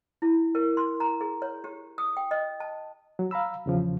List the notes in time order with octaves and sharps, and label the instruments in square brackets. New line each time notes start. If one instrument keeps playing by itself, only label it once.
[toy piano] E4
A#4
C6
A#5
G#4
C#5
G4
D#6
G5
D#5
A5
[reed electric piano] F#3
F5 A#5 B5 E6
E2 C#3 F3